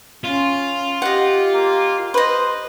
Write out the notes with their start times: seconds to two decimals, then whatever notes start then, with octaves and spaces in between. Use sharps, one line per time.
0.24 C#4 F4
1.02 G4 D#5 F#5
1.54 A#3
2.14 B4 C5 D#5